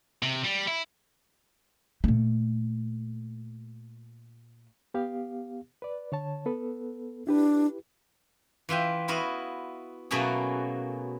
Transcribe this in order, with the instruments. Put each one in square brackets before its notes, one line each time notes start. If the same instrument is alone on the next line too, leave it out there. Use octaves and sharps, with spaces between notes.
[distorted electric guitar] C3
G3
E4
[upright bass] A#2 A3
[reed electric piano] B3 G4 F5
B4 D5
D3 C#5 A5
B3 A4 B4
[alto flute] D4 [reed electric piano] E4 G4 B4
[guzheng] E3 F4 E5 G5
B3 E4 F#4 D#5 F5
B2 F#3 A3 A#3 C#4 G#4